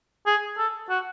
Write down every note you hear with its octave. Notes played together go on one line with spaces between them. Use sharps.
G#4
A4
F#4